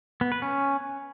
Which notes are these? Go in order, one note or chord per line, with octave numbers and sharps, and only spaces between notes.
B3
B4
C#4